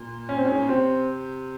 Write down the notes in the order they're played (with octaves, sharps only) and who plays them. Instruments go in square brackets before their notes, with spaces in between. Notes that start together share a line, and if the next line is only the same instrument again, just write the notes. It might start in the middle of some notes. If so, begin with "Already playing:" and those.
Already playing: [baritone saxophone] A#2
[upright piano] C#4
C4
[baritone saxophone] G#2 [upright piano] C#4
[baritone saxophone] A#2
[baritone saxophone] C3 [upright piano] C4